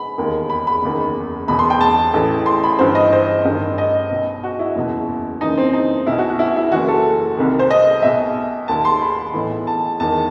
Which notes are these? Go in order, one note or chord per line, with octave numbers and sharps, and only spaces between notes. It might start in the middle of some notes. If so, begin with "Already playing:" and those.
Already playing: B5
E1 D#2 D#3
B5
B5
F#1 E2 D#3
E1 E2 B2 B5
C6
G5
A5
A1 A2 E3
C6
B5
G1 G2 E3 C5
D#5
C5
A1 G2 D#3
D#5
B1 B2
F#4
E4
F#1 E2 B2
F#1 F#2 E3 D#4
C4
D#4
B1 B2 E4
F#4
F#4
E4
E4
F#1 F#2 E3 F#4
A4
C2 C3 D#3
C5
D#5
B1 B2 E5
D#2 D#3 A5
C6
B5
B1 A2 E3
A5
E1 E2 D#3 A5